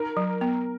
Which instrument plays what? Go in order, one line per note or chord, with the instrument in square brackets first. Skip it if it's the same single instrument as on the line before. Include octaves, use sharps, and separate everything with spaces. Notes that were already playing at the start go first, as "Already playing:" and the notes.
Already playing: [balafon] D#4 [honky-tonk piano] A#4
[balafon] F#3
B3